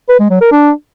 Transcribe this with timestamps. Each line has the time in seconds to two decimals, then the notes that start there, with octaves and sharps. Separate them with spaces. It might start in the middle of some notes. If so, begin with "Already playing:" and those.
0.09 B4
0.19 G#3
0.30 F#3
0.41 A#4
0.51 D4